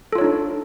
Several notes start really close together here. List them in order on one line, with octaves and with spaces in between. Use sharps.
A4 F4 C#5 D#4 D4